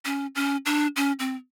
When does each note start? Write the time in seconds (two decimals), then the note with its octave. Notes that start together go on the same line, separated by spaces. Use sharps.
0.05 C#4
0.35 C#4
0.66 D4
0.96 C#4
1.19 C4